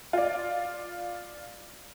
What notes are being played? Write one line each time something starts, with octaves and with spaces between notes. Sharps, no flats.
F4 D5